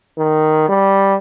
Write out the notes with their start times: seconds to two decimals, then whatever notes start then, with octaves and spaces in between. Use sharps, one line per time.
0.18 D#3
0.69 G3